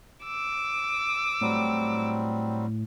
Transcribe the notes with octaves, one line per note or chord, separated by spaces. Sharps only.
D6 E6
A2 F#3 G3 C4